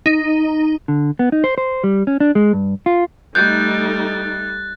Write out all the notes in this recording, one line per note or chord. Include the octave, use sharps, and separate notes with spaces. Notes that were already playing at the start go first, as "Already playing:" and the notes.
D#4
D3
B3
D#4
C5
C5
G3
C#4
D4
G#3
G2
F4
G3 A3 D#4 F#6 G6 A6